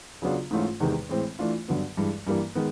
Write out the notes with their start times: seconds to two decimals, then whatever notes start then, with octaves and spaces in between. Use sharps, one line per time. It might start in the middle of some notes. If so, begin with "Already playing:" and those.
0.22 C#3 F#3 B3 D4 F4
0.51 G#2 E3 A3 C#4 F4
0.80 E2 C3 D#3 G#3
1.09 A2 E3 G#3 C4
1.39 E3 A3 D4 F4
1.68 G2 D3 F#3 B3
1.97 G2 E3 G#3
2.27 G2 E3 G3 A#3
2.55 D#3 G#3 B3